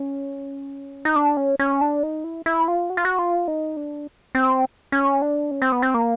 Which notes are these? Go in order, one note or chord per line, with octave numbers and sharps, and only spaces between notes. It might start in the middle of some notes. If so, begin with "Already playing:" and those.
Already playing: C#4
D#4
D4
C#4
C#4
D4
D#4
E4
E4
F4
F#4
F4
F#4
F4
D#4
D4
C4
C#4
D4
C#4
C4
B3
C4
A#3